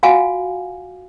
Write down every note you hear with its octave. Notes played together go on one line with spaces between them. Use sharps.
F4 F#4 F5 F#5 G#5